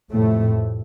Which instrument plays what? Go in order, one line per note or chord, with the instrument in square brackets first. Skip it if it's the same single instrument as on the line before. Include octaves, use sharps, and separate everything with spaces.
[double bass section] F2 A2 C3 A3